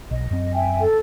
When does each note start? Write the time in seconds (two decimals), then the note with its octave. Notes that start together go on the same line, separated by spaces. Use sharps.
0.11 B1 D#5
0.31 F#2 C4
0.54 E5 G5 G#5
0.81 A4